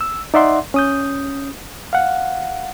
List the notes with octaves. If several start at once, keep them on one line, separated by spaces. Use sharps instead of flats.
E6
D#4 D5 E5 F#5 C6
C#4 D#6 G6
F5 F#5